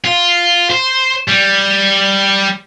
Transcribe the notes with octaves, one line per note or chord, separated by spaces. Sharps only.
F4
C5
G3